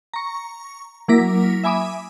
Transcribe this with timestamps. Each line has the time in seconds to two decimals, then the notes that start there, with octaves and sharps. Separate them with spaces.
0.14 A#5 C#6
1.08 F#3 A#3 E4 D6 A#6 B6
1.64 E5 G#5 B5 D6 D#6